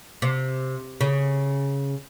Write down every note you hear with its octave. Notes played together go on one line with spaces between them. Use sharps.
C3
C#3